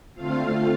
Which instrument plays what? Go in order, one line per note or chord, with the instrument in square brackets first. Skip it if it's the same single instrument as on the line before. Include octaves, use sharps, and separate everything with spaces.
[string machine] D3 A3 C4 F4 F5